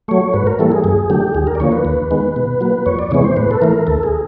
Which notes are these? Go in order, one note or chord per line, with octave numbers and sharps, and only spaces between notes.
F#3 A3 C#5
G#2 B4
A#4
E3 G3 A#3 A4
G#4
F#2 G#4
D3 F#3 A3 G4
D#2 G#4
A#4
D5
D3 F3 A#3 C#5
B4
D#2
D#3 G#3 B3
B2
F#3 A#3
F2 C#5
D5
C3 E3 G#3 B3 C#5
C5
A2 B4
A4
E3 A3 A#4
D2 A4
G#4